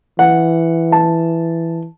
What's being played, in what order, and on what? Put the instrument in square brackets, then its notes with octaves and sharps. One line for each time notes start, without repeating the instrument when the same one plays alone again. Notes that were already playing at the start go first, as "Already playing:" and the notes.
[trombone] E3 [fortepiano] F#5
[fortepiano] A5